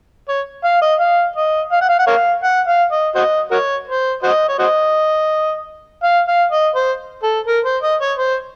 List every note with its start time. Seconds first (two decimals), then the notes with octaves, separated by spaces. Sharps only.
0.28 C#5
0.64 F5
0.82 D#5
1.00 F5
1.36 D#5
1.72 F5
1.81 F#5
1.89 F5
1.99 F#5
2.07 A#4 C#5 F5
2.44 F#5
2.67 F5
2.92 D#5
3.15 F#4 C5 D#5
3.51 F#4 A#4 C#5
3.88 C5
4.23 F#4 C5 D#5
4.49 C#5
4.59 F#4 C5 D#5
6.03 F5
6.28 F5
6.51 D#5
6.76 C5
7.23 A4
7.47 A#4
7.65 C5
7.83 D#5
8.01 C#5
8.18 C5